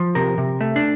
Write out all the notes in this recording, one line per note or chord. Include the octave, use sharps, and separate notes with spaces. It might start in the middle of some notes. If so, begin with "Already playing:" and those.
Already playing: F3
C3 A#4
C3
A3
D4